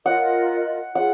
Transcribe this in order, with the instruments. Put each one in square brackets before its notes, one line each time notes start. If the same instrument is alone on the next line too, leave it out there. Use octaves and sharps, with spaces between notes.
[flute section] F4 A#4 D#5 [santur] F#5
[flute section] F4 G#4 [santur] F#5